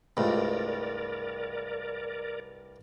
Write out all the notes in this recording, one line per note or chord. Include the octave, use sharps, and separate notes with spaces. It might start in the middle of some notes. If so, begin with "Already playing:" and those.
C2 G2 G#3 A3 F4 A#4 D5